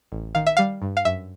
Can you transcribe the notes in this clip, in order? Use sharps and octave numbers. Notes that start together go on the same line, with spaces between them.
A1
D#3 F5
E5
G3 F5
G2
F5
F#2 E5